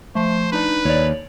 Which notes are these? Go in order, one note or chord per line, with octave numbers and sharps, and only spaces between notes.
F3 A3 C5
D4 D#4 B4 D5
D#2 C#5 D5